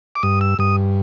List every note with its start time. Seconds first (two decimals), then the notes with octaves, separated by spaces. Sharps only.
0.15 D6
0.23 G2 D#6
0.41 E6
0.59 G2 D#6